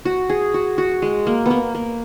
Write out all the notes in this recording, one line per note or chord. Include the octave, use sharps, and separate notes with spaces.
F#4
G#4
F#4
F#4
G#3
A#3
A#3 B3
A#3